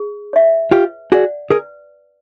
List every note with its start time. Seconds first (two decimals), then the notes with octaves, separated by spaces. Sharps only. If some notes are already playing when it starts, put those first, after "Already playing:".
Already playing: G#4
0.33 C#5 E5
0.71 F4 G4 B4
1.12 F#4 G#4 D5 F#5
1.50 G#4 A#4 B4